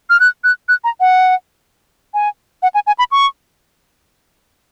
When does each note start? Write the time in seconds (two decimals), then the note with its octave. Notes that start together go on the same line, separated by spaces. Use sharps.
0.10 F6
0.20 F#6
0.44 F#6
0.69 F#6
0.84 A#5
1.00 F#5
2.14 G#5
2.63 F#5
2.74 G#5
2.87 G#5
2.99 B5
3.12 C#6